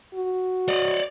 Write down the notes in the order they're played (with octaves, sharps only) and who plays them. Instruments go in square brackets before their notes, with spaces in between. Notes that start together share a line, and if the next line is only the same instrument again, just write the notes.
[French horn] F#4
[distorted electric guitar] D5 D#5